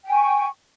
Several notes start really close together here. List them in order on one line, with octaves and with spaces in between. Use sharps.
G5 G#5 C#6